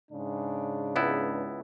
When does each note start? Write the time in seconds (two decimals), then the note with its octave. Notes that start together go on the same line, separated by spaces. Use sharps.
0.11 G#2 C#3 D4
0.96 C#2 B3 E4